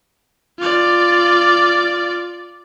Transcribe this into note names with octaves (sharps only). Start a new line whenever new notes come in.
F4 D5